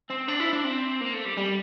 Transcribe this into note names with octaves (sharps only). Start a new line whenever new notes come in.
C4
D4
E4
D4
C4
A#3
A3
G3
G3